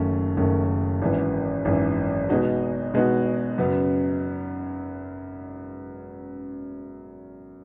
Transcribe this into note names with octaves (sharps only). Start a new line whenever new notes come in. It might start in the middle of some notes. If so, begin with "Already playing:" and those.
Already playing: F#1 F#2 D#3 A3 C#4
F#1 F#2 D#3 A3 C#4
G#1 F#2 E3
G#1 F#2 E3
B2 G#3 B3 D#4 F#4
B2 G#3 B3 D#4 F#4
F#2 C#3 F#3 B3